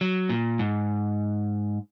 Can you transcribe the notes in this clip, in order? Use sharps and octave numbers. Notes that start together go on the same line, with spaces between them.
F#3
A#2
G#2